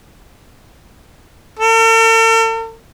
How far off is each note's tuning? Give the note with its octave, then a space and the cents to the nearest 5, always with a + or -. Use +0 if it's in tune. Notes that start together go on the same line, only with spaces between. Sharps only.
A4 +45